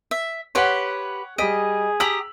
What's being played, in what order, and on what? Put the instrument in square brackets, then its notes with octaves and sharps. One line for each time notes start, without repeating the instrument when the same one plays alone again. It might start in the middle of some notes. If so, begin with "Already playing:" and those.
[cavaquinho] E5
[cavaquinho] G4 B4 C6 [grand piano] C#5 F#5
[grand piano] G3 B6 D7 [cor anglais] G#4 [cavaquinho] D#5
[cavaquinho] G4 A#5 D#6 [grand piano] E6 B6 F#7